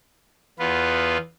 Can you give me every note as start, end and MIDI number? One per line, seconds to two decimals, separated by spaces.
0.59 1.18 40
0.59 1.18 59
0.59 1.18 65
0.59 1.18 71